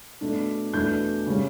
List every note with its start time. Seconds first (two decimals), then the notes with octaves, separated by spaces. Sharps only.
0.21 B2 A3 D4
0.73 E2 B2 A3 D4 G6
1.26 C#3 G3 C#4